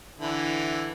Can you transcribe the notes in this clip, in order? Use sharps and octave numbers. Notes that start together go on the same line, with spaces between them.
D3 E3 E4